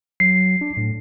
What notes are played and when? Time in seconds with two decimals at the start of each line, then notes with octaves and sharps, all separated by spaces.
0.20 F#3 C7
0.61 D4
0.77 A2